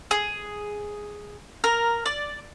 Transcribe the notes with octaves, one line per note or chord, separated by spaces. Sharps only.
G#4
A#4
D5